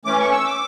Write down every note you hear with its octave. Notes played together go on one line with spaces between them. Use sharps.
E3 A3 C#4 D6
C#6
E6
D6